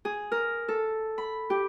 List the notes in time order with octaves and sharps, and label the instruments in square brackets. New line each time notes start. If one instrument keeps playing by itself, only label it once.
[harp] G#4
A#4
A4
B5
G4